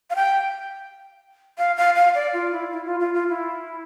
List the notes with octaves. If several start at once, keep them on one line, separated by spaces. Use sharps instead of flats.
F5
G5
F5
F5
F5
D5
F4
E4
E4
F4
F4
F4
E4